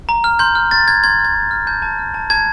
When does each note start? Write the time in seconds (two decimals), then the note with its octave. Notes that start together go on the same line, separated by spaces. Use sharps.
0.09 A#5
0.24 F6
0.39 C6 G6
0.55 F6
0.71 C6 A6
0.88 F6 G#6
1.03 C6 G#6
1.19 F6
1.25 G#6
1.35 C6
1.51 F6
1.67 A5 G6
1.82 A5
1.99 F6
2.14 A5
2.30 A5 G#6